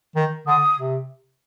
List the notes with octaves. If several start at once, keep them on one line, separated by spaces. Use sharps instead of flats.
D#3
D3 D#6
C3